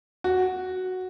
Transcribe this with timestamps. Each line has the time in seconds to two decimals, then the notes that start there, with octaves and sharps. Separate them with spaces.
0.24 F#4